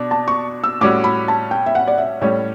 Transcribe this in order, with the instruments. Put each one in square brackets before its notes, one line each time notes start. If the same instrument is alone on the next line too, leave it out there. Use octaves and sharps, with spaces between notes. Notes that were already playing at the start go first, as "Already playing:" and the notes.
Already playing: [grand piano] B2 D4
[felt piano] A5
C#6
E6
[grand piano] A2 G3 C#4 F#4 [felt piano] D6
[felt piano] B5
A5
G5
E5
F#5
D5
E5
[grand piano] A2 G3 C#4 [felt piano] C#5